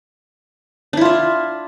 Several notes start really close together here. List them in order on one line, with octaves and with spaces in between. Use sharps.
D4 E4 F4 E5